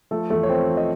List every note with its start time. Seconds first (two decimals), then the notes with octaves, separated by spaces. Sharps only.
0.11 F3 A3 A4
0.30 E2 A3 A4
0.43 C#5
0.49 F3 C4 C5
0.70 F3
0.77 D#5